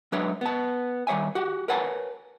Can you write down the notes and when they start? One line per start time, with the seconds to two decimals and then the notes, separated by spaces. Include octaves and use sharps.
0.12 F#3 G#3 D4 B4 C#5 E5
0.41 B3 A5
1.07 D#3 G3 C#5 E5 G#5
1.35 F#4 G4
1.68 A#4 B4 C#5 F#5 G#5 A5